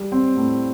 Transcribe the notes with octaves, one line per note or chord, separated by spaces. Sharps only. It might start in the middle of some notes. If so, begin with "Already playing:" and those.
Already playing: G3
C4
A2